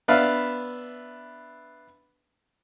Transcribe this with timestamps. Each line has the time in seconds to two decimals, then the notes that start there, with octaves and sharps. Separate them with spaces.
0.08 B3 D4 B4 E5 F5